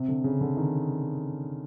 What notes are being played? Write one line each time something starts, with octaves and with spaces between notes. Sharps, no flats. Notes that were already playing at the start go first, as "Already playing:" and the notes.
Already playing: C3
D3
C#3
D3
D#3